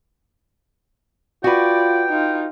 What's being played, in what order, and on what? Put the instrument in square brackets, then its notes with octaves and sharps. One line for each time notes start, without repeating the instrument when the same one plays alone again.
[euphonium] F4 [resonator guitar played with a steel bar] F#4 B4 [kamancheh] D5 [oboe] G5
[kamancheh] D#4 F4